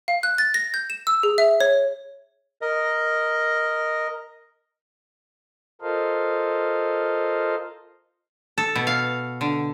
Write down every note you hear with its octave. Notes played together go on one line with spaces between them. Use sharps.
F5
F#6
A6
A#6
G6
E7
E6
G#4
E5
C#5
A#4 D#5
F4 A4 A#4 C5 D#5 F5
A4
B2
F5
D3